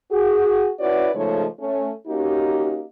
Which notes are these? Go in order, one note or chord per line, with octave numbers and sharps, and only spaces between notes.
F#4 G#4
C#4 E4 F#4 B4 C#5 D5
C#3 F3 G#3 A3 D#4 C#5
A3 C#4
A#3 C#4 D#4 F#4 G4